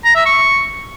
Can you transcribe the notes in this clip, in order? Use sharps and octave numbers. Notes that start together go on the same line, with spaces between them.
A#5
E5
C#6